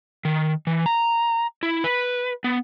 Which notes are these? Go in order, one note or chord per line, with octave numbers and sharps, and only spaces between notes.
D#3
E3
A#5
E4
B4
B3